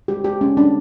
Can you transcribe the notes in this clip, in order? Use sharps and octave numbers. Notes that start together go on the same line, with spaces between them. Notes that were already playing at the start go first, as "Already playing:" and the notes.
G#3 G4
G#3 G4
G#3 C#4
C4 D4